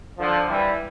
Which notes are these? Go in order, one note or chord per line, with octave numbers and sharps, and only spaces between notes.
D3 F3
E3 G3